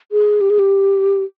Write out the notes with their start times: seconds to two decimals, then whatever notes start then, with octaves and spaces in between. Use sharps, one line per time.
0.12 G#4
0.41 G4
0.50 G#4
0.59 G4